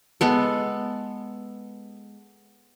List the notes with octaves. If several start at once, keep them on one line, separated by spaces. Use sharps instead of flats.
G#3 B3 A4